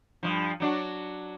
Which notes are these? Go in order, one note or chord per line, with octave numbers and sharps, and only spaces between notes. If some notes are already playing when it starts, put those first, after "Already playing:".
G2 D#3 F3
F#3 D4 F#4